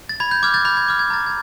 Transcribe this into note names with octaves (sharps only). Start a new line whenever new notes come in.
A6
B5 G#6
G6
D6 F6 G#6
G6 A6
B5 G6
G#6
D6 F6
G#6
A#5 A6
G#6